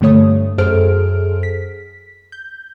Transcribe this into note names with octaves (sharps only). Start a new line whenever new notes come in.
G2 D3 A3 C#5 D#6
F#2 G#4 A4 C5 F6 D7
B6
G6